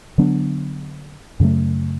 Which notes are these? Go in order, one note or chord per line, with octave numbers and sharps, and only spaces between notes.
D3 F#3 B3 D4
F#2 C#3 F#3 A3